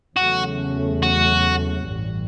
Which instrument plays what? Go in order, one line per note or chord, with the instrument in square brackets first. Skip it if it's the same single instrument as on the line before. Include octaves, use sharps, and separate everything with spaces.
[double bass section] E2 C#3 F#3 A3 C#4 [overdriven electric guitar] F#4
[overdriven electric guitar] F#4
[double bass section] A1 G2 E3 G3